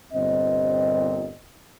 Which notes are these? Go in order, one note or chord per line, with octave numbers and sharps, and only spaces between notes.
G1 A#2 C4 D#5